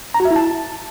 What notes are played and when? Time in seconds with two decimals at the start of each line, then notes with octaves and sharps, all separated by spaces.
0.14 A#5
0.20 F#4
0.25 E5
0.31 E4
0.36 A5